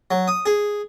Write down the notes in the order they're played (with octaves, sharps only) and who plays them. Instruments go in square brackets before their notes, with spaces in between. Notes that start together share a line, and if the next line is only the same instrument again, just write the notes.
[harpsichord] F#3
D#6
G#4